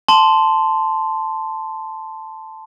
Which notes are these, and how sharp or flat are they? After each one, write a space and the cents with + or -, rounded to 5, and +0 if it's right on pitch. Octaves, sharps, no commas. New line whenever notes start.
A5 +0 C6 -5